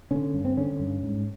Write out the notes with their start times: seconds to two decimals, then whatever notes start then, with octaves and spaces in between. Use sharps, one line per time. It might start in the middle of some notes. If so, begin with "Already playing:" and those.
0.11 D3 C#4
0.34 G2
0.45 C4
0.57 D3 C#4
0.80 G2
1.03 G#2